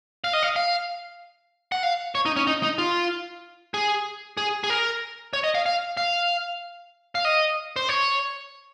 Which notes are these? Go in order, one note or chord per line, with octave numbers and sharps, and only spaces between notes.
F5
D#5
F5
F5
F#5
F5
C#5
D#4
C#4
D#4
D#4
F4
G#4
G#4
G#4
A#4
C#5
D#5
F5
F5
F5
F5
D#5
C5
C#5